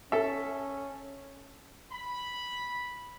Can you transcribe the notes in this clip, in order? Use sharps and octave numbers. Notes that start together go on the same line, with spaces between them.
C#4 A4 E5
B5